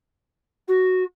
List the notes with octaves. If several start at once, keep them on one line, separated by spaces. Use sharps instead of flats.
F#4